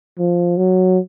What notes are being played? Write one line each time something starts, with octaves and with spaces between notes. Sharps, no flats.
F3
F#3